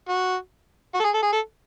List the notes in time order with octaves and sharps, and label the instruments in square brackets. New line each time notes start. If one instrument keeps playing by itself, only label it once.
[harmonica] F#4
F#4
A4
G#4
A4
G#4
A4